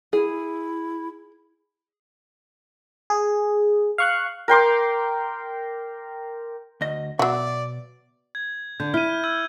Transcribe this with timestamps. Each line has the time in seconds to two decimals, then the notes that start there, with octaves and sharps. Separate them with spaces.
0.13 E4 G#4
3.10 G#4
3.98 F5 C#6 F#6
4.48 A#4 G5 C6 D6
6.81 D2 D#5
7.19 B2 F#3 F#4 D5 E5
8.35 G#6
8.80 D3 G6
8.94 E4 F6 D#7
9.24 E6 G#6 D#7